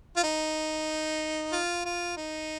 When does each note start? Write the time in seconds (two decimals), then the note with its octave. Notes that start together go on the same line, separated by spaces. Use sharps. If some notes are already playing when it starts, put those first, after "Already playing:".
0.17 F4
0.24 D#4
1.52 F4
1.85 F4
2.17 D#4